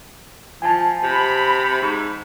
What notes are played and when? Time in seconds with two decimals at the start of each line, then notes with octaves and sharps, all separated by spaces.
0.62 F3 G#5 A5
1.03 C3 B5
1.82 G#2